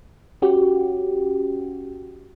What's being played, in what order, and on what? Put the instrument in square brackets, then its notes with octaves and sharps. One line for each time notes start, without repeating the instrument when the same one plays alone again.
[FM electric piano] C#4 F#4 G4